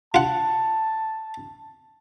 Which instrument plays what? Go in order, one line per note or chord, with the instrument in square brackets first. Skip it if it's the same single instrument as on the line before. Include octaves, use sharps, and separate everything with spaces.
[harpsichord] F4 F#5 [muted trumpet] A5